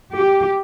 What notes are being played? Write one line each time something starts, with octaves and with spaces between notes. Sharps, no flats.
G4